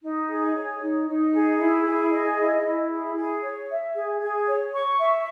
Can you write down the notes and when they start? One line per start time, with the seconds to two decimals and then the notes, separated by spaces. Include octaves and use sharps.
0.02 D#4
0.27 G#4
0.54 C#5
0.81 D#4
1.07 D#4
1.32 G#4
1.58 E4
1.84 G#4
2.11 D#5
2.38 E4
2.63 E4
2.90 G#4
3.15 G#4
3.41 C#5
3.69 E5
3.94 G#4
4.20 G#4
4.47 C#5
4.73 C#6
4.98 E5